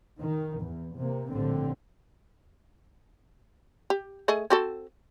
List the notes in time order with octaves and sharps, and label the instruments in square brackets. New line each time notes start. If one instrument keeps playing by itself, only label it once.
[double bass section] D#3
E2
C3 A#3
A#1 A2 D3 G3 C4
[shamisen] G4
A3 G#4 D#5
C4 F#4 A4